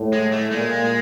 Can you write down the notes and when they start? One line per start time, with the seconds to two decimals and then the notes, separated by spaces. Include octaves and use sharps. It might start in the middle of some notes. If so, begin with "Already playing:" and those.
Already playing: A2
0.13 G#3
0.32 A3
0.51 A#2 G#3